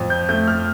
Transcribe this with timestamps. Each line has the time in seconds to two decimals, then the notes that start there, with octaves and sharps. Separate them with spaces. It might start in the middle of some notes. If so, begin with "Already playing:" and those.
Already playing: F2
0.10 G6
0.28 A3 G6
0.47 F6